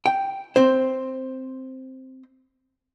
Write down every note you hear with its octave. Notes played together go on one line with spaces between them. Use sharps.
G5
C4 C5